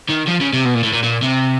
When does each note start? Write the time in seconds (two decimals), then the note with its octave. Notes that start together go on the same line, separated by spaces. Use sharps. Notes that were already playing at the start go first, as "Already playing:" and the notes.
0.10 D#3
0.28 F3
0.41 C#3
0.53 C3
0.65 B2
0.74 A#2
0.83 A2
0.93 A#2
1.03 A#2
1.22 C3